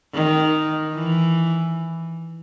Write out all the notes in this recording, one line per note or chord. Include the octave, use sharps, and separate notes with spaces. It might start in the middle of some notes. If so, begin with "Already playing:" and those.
D#3
E3